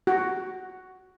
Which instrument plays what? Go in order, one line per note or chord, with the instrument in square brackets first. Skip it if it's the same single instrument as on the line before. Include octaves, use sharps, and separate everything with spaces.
[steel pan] F#4